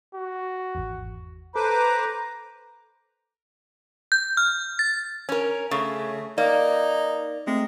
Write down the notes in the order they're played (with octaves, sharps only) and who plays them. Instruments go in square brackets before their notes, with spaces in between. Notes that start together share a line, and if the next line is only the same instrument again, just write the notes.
[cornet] F#4
[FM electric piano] G#1 E2
[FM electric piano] A4 [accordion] B4 C5 D6 [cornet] A#5
[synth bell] G6
F6
A6
[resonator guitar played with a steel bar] C#4 A#4
[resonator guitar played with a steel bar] C#3 [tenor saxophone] A3
[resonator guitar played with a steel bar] A#3 [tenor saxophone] D#4 [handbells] D5
[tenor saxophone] G#3 [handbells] A3 C4 A#6